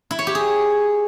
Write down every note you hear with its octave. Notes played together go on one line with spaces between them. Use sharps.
E4
C#5
G4
G#4